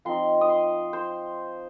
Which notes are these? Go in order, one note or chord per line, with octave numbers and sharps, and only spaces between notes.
F3 C4 D#4 C6
D#6
C6
C5